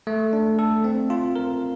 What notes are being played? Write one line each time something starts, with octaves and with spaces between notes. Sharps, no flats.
A3
D4
A4
C4
F4
A#4